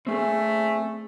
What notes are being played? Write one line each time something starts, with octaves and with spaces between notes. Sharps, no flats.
A3 C4 G#4 A4